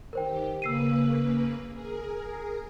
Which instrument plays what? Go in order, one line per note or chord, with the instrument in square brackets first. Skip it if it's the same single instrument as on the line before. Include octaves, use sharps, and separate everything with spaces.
[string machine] D#3 G4 [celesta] A#4 C5 G5
[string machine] C#3 A#3 B4 [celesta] E6 C7 D#7
[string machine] G#4 A#4